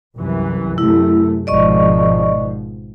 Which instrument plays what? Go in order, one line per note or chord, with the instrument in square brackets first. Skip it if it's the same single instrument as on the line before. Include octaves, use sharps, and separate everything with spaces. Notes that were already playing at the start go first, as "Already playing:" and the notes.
[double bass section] C2 F#2 E3
[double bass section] F#2 C3 A3 [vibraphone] E4
[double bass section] G#1 B2 F3 [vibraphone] D5 D#5 C#6